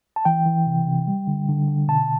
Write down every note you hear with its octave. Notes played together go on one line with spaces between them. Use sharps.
A5
E3 G5
E3
C3
C3
G3
D3
D3
D3
B2 A5